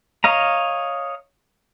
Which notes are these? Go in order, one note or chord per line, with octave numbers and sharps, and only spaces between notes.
C#5 D#5 F5 A#5